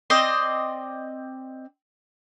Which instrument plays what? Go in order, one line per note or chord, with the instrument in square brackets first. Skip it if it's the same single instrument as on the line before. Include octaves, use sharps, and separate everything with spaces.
[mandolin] C4 D5 D#5 C6